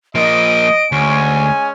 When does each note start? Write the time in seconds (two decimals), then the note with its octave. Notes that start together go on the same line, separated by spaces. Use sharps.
0.15 F3 A#3 D#5 D7
0.92 D2 G#3 C#4 G#5